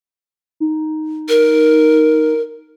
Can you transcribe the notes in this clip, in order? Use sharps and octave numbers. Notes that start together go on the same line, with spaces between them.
D#4
A#4